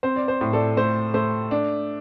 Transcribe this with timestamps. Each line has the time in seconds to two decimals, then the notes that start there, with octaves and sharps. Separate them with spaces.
0.03 C4 C5
0.16 D5
0.28 C5
0.41 A2
0.53 A4 D5
0.77 A3 C5
1.14 A3 C5
1.51 D4